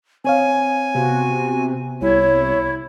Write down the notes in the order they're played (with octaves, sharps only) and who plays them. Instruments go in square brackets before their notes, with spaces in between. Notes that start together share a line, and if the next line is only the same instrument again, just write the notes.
[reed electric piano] C4 C#5 F5 [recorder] G#5
[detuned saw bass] C3 [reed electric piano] B3 [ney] F#4
[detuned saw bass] C2 [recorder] E4 [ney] C#5